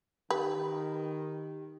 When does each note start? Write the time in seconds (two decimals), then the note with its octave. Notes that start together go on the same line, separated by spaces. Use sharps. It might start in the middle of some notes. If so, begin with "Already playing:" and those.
0.31 D#3 G4 B4